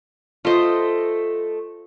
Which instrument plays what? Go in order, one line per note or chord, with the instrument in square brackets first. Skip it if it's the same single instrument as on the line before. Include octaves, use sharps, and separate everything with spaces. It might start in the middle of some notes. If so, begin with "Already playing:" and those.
[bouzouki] A3 D#5 [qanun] F4 C5